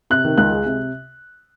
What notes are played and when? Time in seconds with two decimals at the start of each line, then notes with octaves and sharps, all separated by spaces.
0.10 C3 F#6
0.25 D#3
0.38 C#2 F#6
0.52 G#3
0.66 C3